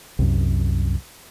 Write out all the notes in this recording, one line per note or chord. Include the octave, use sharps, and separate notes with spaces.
C2 F#2